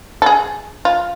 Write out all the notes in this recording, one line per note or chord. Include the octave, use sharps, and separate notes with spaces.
A4
G#4
F4